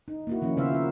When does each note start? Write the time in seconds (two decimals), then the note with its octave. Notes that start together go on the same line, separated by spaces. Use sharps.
0.08 D#4
0.27 A#3 E4 F#4
0.42 D#3 F3 A#3 C#4 D#4
0.57 C#3 B3 F4 C5 E5 F5
0.74 A#4